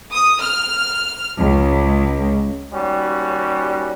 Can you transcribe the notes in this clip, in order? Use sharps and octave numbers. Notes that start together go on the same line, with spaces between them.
D#6
F6
C#2
D#2 G3 C#4 F#4